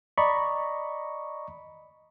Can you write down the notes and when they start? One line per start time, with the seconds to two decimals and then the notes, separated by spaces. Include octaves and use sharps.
0.18 D5 D#5 A#5 B5 C#6